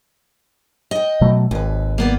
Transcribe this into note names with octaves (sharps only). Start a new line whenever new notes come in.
D#5 G5
B2 F#3 A3
G#1 D#2 B4
A#3 B3 D5